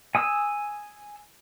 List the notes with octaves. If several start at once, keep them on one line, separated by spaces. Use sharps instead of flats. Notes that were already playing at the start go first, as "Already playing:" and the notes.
G#5 D#6 E6